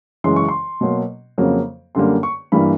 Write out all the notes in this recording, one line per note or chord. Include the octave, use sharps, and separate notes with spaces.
F#2 C#3 E3 G#3 C6
C#6
C6
B2 F#3 A#3
F2 C#3 F#3 A#3
F#2 D3 G3 A#3 C6
C#6
G2 E3 G3 A#3 B5